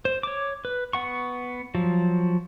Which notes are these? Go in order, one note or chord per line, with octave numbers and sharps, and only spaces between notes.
C5
C#5 D6
B4
B3 F#5 C#6
F3 F#3